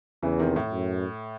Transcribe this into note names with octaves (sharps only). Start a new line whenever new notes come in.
E2 C#3 E3
C3 D#3
A2
F#2